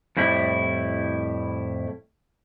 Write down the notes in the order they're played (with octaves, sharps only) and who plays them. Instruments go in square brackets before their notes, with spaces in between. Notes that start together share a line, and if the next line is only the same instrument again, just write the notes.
[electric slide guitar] F2 A2 G3 E4